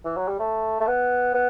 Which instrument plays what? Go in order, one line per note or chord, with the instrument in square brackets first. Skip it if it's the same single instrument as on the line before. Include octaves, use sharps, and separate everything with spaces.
[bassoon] E3
F#3
G3
A3
A3
B3
B3